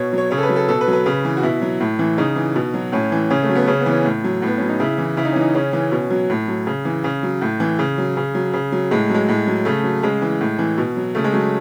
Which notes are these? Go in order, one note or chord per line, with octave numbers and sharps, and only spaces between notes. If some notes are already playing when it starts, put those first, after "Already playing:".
Already playing: B2 C#5
F#3
C#5
C#3 C#5
A4
B4
F#3
A4
B2 A4
B4
F#3
B4
C#3
E3
F#4
B2 E4
F#3
A2
E3
C#3 D#4
E3
B2
F#3
A2 C#4
E3
C#3 C#4
A3
F#3
B3
C#3 C#4
B3
E3
C#4
A2
F#3
A2 B3
F#3 C#4
D#4
C#3 E4
E3
C#3 E4
D#4
C#4
E3
D#4
C#3 C#4
E3
B2
F#3
A2
F#3
C#3
E3
C#3
F#3
A2
E3
C#3
F#3
C#3
F#3
C#3
F#3
A2 G#3
F#3 G#3
A2
F#3
C#3 A3
F#3
C#3 G#3
E3
A2
E3
B2
F#3
C#3 A3
G#3
F#3 A3